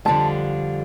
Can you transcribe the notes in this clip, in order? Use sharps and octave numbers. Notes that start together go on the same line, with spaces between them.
F2 D3 G3 D4 F4 A5